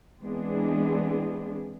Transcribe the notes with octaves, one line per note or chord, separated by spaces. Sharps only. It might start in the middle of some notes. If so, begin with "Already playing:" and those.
E3 G#3 B3 C4 D4 G#4